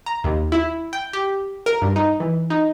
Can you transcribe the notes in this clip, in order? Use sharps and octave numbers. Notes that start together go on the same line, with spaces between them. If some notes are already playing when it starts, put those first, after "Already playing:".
A#5
D#2
E4
G5
G4
A#4
G2
D#4
E3
D#4